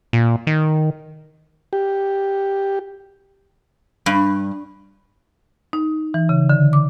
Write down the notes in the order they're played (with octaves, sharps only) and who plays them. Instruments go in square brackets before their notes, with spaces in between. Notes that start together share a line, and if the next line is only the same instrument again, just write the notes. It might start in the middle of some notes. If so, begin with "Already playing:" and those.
[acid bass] A#2
D#3
[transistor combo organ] G4
[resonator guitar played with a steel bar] G2
[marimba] D#4
E3
C#3
D3
D6